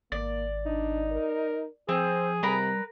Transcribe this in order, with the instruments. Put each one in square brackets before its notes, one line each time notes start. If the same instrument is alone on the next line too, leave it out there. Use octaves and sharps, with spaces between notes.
[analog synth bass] G#1 [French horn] A#3 [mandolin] D5
[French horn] D4 [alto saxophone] D#4
[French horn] A#4
[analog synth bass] F3 [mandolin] C4 [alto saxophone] G#4 [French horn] C5
[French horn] C3 [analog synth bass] G3 [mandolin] A#4 B4 A#5